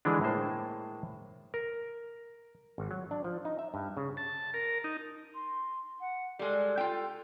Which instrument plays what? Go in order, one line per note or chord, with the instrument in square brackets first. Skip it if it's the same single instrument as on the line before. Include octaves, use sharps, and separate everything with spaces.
[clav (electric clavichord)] D3 E3 G#3 D4
A2 G#3 A#3 C5
A#4
G#1
F#3
D4
F3
D#4
E5
G2
C#3
[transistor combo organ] A5
A#4
D#4
[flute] C6
F#5
[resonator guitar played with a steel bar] G3 G#3 [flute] A4
[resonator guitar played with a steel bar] F4 G5